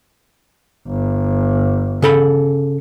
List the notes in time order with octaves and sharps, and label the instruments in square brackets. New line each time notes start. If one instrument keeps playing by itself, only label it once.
[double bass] G1
[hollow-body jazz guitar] C#3 A4 B5